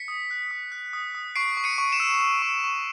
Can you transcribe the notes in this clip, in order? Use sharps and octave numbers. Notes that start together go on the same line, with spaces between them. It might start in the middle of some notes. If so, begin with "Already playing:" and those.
Already playing: B6 C#7
D#6
F#6
D#6
F#6
D#6
D#6
C#6 C7 D7
C#6
C#7 D#7
C#6
D7 E7
E6
E6
C#6
C#6